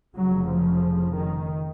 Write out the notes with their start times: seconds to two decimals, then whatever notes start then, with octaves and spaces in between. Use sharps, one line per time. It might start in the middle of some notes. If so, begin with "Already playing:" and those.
0.16 F1 F2 C#3 F#3
0.48 F3
1.14 D#3